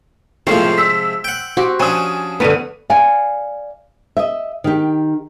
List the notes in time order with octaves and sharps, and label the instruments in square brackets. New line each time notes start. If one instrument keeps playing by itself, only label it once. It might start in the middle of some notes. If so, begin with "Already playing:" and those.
[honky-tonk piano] A2 A#3 F4 [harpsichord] C3 F3 G#3 [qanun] C5 [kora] F5
[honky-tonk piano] E6 B6
[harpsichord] F#5 G5
[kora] C4 G4 [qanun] F#4
[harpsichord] F3 D4 [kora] C#4 [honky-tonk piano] G#5 D#6
[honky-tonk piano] D2 G2 D#7 [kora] D3 B3
[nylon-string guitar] D5 F5 F#5 G#5
D#5 E5
D#3 G4